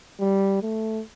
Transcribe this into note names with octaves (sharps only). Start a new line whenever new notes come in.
G3
A3